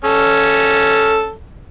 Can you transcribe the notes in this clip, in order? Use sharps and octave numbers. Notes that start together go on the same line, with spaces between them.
C#4 A4